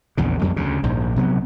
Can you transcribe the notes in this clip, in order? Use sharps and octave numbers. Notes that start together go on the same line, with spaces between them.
A#1 E2 C#3
F2 F#3 G3
D2 C#3
A#1 G#2
C3 F#3 B3